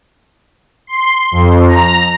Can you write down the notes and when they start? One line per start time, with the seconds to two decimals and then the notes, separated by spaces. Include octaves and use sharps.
0.87 C6
1.32 F2
1.68 A#5